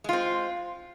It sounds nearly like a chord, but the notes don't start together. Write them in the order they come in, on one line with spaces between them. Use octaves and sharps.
G#3 F4 C4